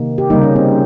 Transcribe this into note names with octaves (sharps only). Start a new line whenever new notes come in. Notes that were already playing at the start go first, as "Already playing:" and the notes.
Already playing: C3 D#3 A#3
G4
C#3 G3 A#3 D#4
C#4
C4